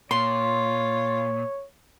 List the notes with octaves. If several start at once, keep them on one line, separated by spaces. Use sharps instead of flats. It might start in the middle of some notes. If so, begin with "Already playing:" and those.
A#2 F4 C#5 C6